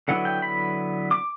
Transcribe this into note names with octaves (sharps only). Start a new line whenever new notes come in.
D3 F#3 B3 E4 F#5
G5
B5
D6